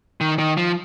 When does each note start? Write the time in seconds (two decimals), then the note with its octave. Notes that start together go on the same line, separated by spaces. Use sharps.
0.21 D#3
0.39 D#3
0.57 F3